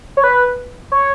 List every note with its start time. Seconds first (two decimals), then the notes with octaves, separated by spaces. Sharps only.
0.17 C#5
0.24 B4
0.92 C#5